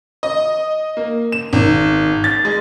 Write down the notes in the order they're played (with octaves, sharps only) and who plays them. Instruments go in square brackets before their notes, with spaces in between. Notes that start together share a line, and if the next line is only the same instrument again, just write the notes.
[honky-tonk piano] D#5
A#3
E7
G#1
A6
G#3